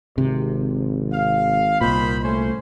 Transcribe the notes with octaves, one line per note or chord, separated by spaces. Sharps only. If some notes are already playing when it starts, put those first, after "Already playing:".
G#1 C3
F5
C2 A#2 D#3 C5 B5
A3 C#4 C5